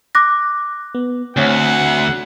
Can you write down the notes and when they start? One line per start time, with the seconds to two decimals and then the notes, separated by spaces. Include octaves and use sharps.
0.15 D6 F#6 A#6
0.95 B3
1.37 D2 C4 C#5 F#5 G#5